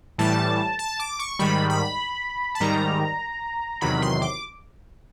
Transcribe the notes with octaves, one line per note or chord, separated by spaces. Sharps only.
A2 E3 G3 A5
A5
D6
C#6
G#2 D#3 G3 B5
B5
A5
G#2 D#3 G3 A#5
E2 C3 D#3 F#3 B5
C6
D6